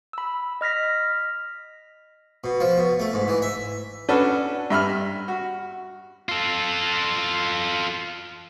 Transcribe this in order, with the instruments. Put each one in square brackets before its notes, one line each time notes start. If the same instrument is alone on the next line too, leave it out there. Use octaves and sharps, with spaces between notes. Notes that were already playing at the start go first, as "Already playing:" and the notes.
[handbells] B5 E6
D#5 F6 A#6 B6
[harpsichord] B2
F3
B2
A3
G#2
E3
E5
[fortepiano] C#4 D4 F#4 A4 B4
G2 E5 B5 F6
F#4
[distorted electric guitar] F4 A4